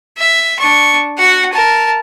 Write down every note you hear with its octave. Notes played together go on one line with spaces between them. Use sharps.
E5
D4 C#6
F#4 F#5
A#4 A5